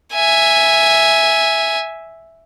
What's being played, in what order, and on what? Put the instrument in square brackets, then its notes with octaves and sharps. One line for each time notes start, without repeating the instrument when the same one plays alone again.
[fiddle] E5 G#5